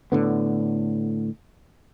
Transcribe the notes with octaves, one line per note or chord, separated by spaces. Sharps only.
A2 D3 B3